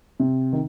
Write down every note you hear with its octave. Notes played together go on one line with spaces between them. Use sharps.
C3
D#3